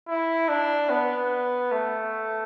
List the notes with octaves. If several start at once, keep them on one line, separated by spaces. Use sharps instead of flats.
E4
D4
B3
A3